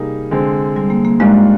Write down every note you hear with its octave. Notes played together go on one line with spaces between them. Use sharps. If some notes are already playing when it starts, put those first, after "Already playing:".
Already playing: C3 G3 A#3 D#4 G#4
D3 G#3 C4
G3
A#3
A#3
G#2 G3 G#3 D4 F4 A#4